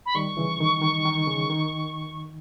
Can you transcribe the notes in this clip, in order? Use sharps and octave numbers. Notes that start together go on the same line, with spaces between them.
B5
D#3 G3 C#6
C#3 E3
D#3
D#3
D#3
C#3
D#3